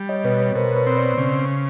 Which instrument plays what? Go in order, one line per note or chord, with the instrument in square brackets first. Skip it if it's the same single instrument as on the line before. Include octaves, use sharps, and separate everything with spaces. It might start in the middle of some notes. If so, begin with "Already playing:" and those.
Already playing: [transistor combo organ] G3
[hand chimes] C#5 D#5
[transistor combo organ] B2 [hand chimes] B4 C#5
[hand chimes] B4 C#5
[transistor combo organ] B2 [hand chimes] A#4 C5
[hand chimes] B4 C#5
[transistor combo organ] C4
[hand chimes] C5 D5
[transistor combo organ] C#3